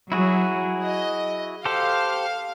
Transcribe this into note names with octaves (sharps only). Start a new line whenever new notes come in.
F#3 E4 F#4 G#4
D#5
G4 A4 C5 F5